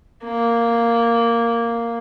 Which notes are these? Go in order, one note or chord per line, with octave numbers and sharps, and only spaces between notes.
A#3